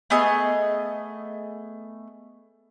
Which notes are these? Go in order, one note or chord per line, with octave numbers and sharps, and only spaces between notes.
A3 B3 G#4 D#5